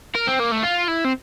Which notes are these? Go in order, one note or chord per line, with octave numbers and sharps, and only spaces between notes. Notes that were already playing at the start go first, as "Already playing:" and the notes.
A#4
C4
A#3
A3
F4
E4
C4